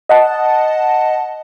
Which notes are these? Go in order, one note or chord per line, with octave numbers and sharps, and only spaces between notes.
D#5 F#5 A5